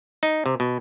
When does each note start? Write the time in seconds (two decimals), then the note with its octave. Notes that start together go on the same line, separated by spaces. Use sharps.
0.23 D#4
0.46 C3
0.60 B2